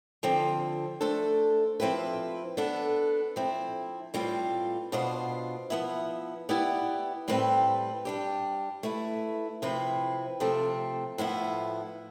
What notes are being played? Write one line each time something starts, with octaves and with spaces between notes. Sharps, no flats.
D3 F3 C4
A3 D4 A4 C5
F3 C4 E4 G4 B4
B3 D4 A4
F3 C4 E4
A2 G3 C4 F4 B4
B2 B3 D4 F4 C5
F3 B3 E4
B3 E4 G4 D5
A2 G3 C4 G4 B4
G3 D4 G4
A3 E4 B4
C3 F3 C4 E4 B4
C3 F3 A3 C4
A2 F3 B3 E4